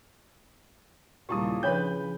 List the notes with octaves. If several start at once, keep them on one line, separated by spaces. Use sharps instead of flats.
D#2 A#2 C#3 G3 E4 G4 A5 D#6
C#3 F3 D4 B4 C#5 B5 G6